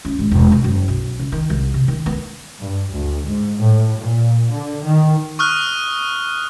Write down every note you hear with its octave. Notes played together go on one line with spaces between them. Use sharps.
C#4
G#1
E1
B2
F#1
B1
C#3
D#3
C2
C3
D#3
B3
G2
D2
G#2
A2
A#2
D3
D#3
C#6 D#6 F6 F#6